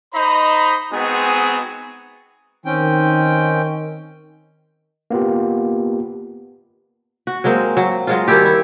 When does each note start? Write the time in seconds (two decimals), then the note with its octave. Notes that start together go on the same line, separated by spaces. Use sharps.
0.14 D#4 C5 D#5 A#5 B5
0.92 G#3 B3 C4 D#4 F#4 G#4
2.66 D#3 C4 C#4 G5
5.11 A#3 B3 F4 G4
7.27 F#4
7.44 F#3 G#3 A#3 C4
7.77 F#3
8.07 F#3 G#3 F4
8.28 D#3 G3 E4 G4
8.45 E4